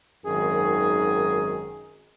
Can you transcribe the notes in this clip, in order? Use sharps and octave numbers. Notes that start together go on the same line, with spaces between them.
G#1 F#2 D#3 G#4